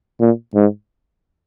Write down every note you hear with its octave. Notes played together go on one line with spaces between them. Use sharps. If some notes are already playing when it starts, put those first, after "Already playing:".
A#2
G#2